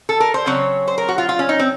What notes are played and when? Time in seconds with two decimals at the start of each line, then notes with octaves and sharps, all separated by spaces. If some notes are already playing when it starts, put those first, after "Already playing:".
0.09 A4
0.20 A#4
0.34 C5
0.46 C#3 F#3 C4 C#5
0.87 C5
0.98 A#4
1.08 F#4
1.18 F4
1.29 F4
1.39 C#4
1.49 D#4
1.59 C4